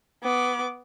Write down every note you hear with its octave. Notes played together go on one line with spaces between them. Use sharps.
B3 D6